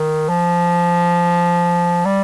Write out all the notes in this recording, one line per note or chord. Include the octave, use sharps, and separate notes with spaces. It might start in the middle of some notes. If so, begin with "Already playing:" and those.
Already playing: D#3
F3
G3